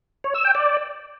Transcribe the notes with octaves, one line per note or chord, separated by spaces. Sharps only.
C#5
E6
G5
D5